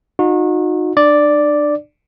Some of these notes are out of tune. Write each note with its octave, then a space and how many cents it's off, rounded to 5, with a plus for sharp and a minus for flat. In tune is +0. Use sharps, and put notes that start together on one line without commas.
D#4 -10 F#4 -35
D4 +35 D5 +0